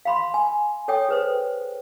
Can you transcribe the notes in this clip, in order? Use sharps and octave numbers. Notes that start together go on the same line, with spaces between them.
F5 B5 C6
G#5
A4 C#5 G5 D#6
G#4 B4 C5